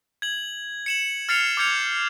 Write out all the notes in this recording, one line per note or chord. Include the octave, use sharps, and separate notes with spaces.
G#6 F#7
C#7 E7 F#7
F6 A6 C7 C#7 F7
D6 F6 G6 G#6 C#7 F7